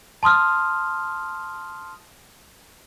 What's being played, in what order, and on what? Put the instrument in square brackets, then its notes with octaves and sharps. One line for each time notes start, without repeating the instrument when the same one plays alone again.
[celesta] A5 C6 D#6 F6